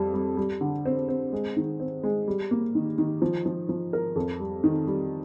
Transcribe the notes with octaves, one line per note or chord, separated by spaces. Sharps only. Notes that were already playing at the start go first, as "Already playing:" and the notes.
Already playing: F2 G3
G3
G3
D3
C4
C4
G#3
D#3
C4
G#3
G3
A#3
D#3
D#3
F3
F3
F3
A#4
F2
G3
D#3
G3